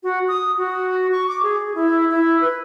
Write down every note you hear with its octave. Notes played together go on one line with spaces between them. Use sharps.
F#4
D#6
F#4
C#6
D6
G#4
E4
E4
B4